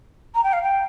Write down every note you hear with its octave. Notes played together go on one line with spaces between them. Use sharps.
A#5
G5
F5
G5